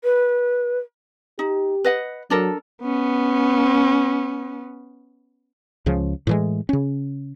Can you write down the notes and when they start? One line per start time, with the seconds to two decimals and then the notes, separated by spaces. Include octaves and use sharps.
0.04 B4
1.39 D#4 G4
1.84 B4 D#5 F#5
2.30 F#3 D4 A4 A#4
2.82 B3 C#4
5.86 C#2 C#3 F3
6.27 A2 E3 G#3
6.69 C#3 C#4